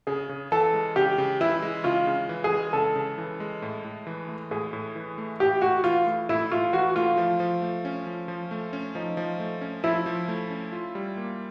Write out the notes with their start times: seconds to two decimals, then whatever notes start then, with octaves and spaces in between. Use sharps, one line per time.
0.07 C#3 G#4
0.29 C#3
0.52 E3 A4
0.74 G#3
0.96 C#3 G4
1.18 C#3
1.40 E3 E4
1.62 G#3
1.84 C#3 F4
2.07 C#3
2.29 E3
2.44 G#4
2.51 G#3
2.73 C#3 A4
2.95 C#3
3.18 E3
3.40 G#3
3.62 A2
3.84 A2
4.07 E3
4.29 A3
4.51 A2 G#4
4.73 A2
4.96 E3
5.18 A3
5.40 A2 G4
5.62 A2 F#4
5.84 E3 F4
6.07 A3
6.29 A2 E4
6.51 A2 F4
6.73 E3 F#4
6.96 A3 F4
7.17 F3
7.40 F3
7.62 A3
7.85 C#4
8.07 F3
8.28 F3
8.51 A3
8.73 C#4
8.95 F3 D#4
9.17 F3
9.40 A3
9.61 C#4
9.84 F3 E4
10.06 F3
10.28 A3
10.50 C#4
10.72 F4
10.95 G3
11.17 A#3